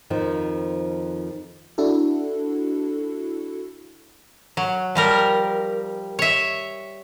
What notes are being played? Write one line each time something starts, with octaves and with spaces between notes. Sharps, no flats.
F2 D#3 F3 D#4
D4 E4 F#4 A4
F#3
F3 G3 A#4
C#5 E5